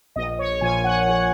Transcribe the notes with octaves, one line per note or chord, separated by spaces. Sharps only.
A#1 D#5
C#5
A#2 F3 G#5
F#5
A#1 F#5